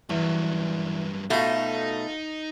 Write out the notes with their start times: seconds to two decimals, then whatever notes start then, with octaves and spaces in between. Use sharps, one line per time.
0.10 E2 G2 F#3
1.30 B2 A3 D#4 F4 F#4